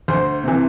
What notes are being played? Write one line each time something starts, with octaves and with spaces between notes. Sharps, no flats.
D2 C5
C3 E3